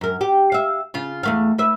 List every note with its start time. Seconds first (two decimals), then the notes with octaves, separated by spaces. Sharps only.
0.01 F#2 A#4
0.21 G4
0.52 E5 F5
0.94 C#3 F4
1.23 E2 A3 F5
1.58 B4 E5